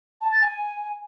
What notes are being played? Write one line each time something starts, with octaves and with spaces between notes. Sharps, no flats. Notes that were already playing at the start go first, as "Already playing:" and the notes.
A5
A6
G#5